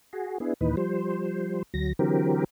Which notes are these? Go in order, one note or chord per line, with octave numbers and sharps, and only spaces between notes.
F#4 G#4
B3 D4 E4 G#4
D#2 A#2 E3 D#4 B4
F3 G3 C5
D2 F#3 A#6
D3 E3 F#3 C4 G4 A#4